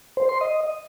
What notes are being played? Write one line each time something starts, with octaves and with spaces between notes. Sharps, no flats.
C5
C6
D#5